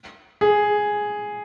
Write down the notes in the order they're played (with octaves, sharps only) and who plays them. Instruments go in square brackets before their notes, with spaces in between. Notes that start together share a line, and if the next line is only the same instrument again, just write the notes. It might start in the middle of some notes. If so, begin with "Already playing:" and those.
[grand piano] G#4